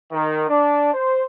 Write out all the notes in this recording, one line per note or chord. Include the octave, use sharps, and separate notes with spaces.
D#3
D4
C5